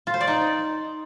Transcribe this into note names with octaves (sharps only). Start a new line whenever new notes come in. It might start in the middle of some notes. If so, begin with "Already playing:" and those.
F4
C5
D5
D#4